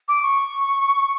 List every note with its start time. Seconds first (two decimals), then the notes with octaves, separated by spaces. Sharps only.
0.08 D6
0.23 C#6